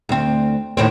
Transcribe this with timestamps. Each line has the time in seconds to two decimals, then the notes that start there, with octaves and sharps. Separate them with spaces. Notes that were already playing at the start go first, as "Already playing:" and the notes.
0.09 D2 C4
0.77 D#2 A2 C4